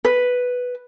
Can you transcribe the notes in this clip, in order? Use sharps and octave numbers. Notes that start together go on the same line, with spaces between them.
B4